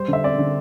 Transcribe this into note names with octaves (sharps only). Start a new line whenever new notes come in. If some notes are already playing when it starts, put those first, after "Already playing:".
Already playing: G3 C5
D3 E5
C4 D5
D3